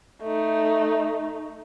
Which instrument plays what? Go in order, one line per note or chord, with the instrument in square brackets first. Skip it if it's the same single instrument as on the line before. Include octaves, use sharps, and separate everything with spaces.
[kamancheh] A3 D#4